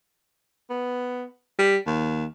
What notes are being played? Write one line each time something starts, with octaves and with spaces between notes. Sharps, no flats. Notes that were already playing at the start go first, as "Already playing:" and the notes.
B3
G3
D#2